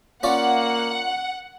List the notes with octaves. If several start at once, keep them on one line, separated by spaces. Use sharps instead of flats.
A#3 C#4 F4 D5 F#5